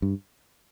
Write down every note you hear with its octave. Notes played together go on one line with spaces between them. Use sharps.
G2